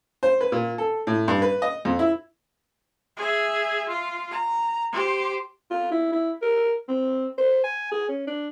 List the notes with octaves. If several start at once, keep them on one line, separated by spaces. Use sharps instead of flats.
C5
B4
A#2
A4
A2
G2
B4
D#5
F2
E4
G#4 E5
F4
A#5
G4 C5
F4
E4
E4
A#4
C4
C5
G#5
G#4
C#4
D4